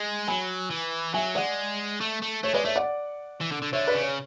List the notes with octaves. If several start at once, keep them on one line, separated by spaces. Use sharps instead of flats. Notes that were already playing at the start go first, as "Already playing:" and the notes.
Already playing: G#3
F#3 G#5 B5
E3
F#3 E5 G#5
G#3 D5 F#5
A3
A3
A3 C#5
G#3 B4 D5
A3 C#5 E5
D5 F#5
E3
D3
D3
D3 C#5 E5
B4 D5
C#3
C#5